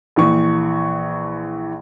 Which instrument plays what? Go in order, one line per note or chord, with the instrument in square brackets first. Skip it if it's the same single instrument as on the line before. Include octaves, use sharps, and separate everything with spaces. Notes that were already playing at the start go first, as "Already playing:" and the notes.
[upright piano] A#1 E3 C#6